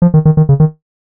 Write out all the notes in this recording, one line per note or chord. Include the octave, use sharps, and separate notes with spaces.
F3
D#3
D#3
D#3
C#3
D#3